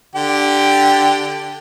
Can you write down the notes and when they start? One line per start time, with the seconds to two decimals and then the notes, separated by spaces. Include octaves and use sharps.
0.15 D3 G4 G5